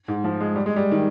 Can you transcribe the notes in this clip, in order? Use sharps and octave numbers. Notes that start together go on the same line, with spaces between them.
G#2
F3
G#3
G3
G#3
G3
D#3